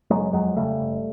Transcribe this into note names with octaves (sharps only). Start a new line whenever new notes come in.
F#1 F#3 G#3
F2 F#3 G#3
C#3 G3 A3
F#1